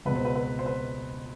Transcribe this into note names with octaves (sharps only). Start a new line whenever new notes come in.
C#2 B2 B4
C5
B4
B4
C5
B4